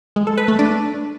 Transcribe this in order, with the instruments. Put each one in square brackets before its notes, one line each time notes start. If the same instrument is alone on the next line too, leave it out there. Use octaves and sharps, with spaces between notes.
[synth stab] G#3
A4
B4
A3
D4